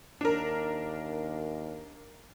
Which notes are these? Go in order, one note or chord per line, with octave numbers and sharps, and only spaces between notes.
D#2 D4 A#4